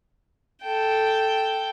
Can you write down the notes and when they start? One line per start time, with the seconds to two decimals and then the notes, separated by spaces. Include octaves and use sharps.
0.62 A4 G5